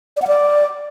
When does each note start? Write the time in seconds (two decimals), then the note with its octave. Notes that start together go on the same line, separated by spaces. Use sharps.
0.17 D5
0.22 F#5
0.27 D5